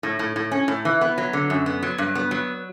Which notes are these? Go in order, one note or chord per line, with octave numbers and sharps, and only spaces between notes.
A2
A2
A2
C#4
A2
E3
B3
F#3
D3
F#2
B3
F#3
G2
B3
F#3